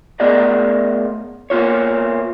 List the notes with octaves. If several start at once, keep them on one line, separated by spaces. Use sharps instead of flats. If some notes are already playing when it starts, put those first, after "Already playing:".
A3 B3 G#4 A#4 D5 D#5
A#3 B3 F4 C#5